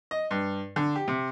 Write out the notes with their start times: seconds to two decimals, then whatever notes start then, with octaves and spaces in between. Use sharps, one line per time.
0.11 D#5
0.31 G2
0.76 D3
0.96 G4
1.08 C3